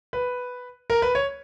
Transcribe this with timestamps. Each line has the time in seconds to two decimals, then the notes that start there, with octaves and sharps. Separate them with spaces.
0.13 B4
0.90 A#4
1.02 B4
1.15 C#5